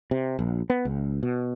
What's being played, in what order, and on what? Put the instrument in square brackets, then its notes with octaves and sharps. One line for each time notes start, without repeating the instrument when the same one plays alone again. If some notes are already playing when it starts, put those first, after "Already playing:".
[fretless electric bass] C3
A#1
B3
C#2
B2